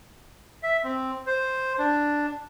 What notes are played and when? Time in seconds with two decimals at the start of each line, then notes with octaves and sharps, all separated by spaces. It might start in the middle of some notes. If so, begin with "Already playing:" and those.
0.63 E5
0.84 C4
1.27 C5
1.79 D4